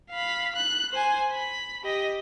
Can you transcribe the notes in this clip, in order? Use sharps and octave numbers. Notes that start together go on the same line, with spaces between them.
F5 B5
F#6
C5 G#5
B5
G4 D#5